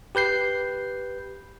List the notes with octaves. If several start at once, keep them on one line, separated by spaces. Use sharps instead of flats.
G4 B4 G6 C7